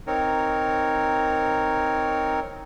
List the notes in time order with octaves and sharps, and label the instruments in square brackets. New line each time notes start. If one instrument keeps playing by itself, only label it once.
[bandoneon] C4 D#4 A#4 C#5